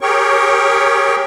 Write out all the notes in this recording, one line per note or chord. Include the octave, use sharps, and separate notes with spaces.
G4 G#4 A#4 C#5 G5 C#6